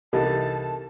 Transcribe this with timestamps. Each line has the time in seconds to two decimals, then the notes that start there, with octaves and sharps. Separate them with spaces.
0.13 C2 E3 D#4 G4 A4 A#4 D#5 A5